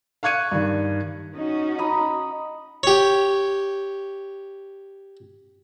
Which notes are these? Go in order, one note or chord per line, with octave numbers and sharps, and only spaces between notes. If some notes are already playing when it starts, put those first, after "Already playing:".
F5 C#6 F#6 G#6 C#7 D#7
G2 D#3
C#4 D#4 F#4
D#5 A#5 B5
G4 C#5